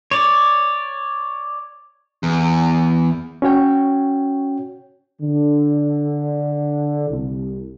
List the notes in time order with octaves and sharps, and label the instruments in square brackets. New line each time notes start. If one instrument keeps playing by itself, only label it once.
[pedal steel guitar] C#5 D5
[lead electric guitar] E2
[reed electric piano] C#4 F#4 C#5 G5
[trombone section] D3
C2